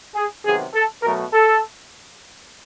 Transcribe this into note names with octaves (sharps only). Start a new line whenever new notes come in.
G#4
C3 D#3 F#3 B3 G#4
A4
B2 F#3 A3 A#4
A4